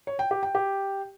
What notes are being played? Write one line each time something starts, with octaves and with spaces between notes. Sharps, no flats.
C#5
G5
G4
G5
G4